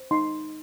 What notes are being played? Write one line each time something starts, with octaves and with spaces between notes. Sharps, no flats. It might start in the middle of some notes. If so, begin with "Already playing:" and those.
Already playing: C5
D#4 C6